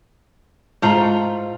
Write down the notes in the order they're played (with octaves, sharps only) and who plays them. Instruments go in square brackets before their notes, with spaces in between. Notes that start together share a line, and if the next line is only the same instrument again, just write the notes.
[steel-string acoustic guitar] G#2 [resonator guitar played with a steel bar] A3 F4 A#5